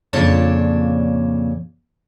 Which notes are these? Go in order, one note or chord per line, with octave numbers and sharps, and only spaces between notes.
F2 A#2 C#3 D4 C#5 A5